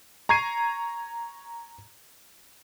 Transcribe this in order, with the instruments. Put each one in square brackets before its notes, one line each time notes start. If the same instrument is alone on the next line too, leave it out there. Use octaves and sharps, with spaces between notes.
[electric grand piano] A#5 C#6 G#6 C7 D#7